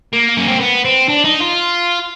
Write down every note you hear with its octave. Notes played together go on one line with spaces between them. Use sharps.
A#3
C#4
C4
B3
C4
D4
D#4
F4